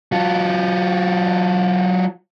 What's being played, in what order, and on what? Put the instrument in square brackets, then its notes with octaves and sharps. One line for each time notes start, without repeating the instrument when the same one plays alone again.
[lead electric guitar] F#3 F4